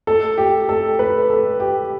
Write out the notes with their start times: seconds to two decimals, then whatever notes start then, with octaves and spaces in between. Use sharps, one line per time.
0.07 A4
0.38 G4
0.69 A4
0.99 B4
1.30 A4
1.60 G4